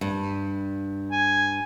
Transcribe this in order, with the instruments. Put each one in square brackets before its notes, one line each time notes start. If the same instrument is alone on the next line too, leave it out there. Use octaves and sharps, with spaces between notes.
[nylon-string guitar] G2
[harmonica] G#5